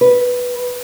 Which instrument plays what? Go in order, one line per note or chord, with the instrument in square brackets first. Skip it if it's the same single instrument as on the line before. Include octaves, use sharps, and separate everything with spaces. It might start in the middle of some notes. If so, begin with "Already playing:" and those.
[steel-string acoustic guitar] B4